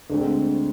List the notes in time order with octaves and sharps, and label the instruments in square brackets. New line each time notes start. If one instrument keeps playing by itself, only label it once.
[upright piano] D2 D3 G#3 C4